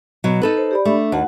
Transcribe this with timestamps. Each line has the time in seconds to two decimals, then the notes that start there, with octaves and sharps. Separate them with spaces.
0.24 B2 F#3
0.42 D#4 A4 B4
0.57 C5
0.71 G4 D5 B5
0.85 A3 D4
1.12 D#2 F#4 F#5 A5